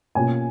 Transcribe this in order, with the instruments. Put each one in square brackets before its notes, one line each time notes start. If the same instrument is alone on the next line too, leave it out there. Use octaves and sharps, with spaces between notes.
[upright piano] B2 A#3 C#4 F4 G#5